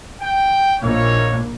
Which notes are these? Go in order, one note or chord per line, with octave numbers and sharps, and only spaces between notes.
G5
A#1 A#2 D#4 E4 C#5